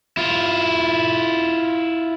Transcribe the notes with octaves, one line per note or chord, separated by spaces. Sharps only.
E4 F4